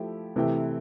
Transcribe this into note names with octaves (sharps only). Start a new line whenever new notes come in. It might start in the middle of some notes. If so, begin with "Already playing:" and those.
Already playing: F3 A3 E4 G4
C3 E3 A3 E4 G4